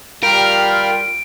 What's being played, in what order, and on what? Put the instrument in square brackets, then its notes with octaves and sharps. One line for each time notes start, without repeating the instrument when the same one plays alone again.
[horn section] G3 F4 [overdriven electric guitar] A#4 [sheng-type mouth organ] F5 G5 B5 [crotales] D7